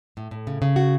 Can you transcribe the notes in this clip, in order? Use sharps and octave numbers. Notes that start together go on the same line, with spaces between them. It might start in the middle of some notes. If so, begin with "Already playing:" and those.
A2
A2
C#3
C#3
F#4